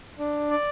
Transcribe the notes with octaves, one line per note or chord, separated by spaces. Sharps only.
D4
D5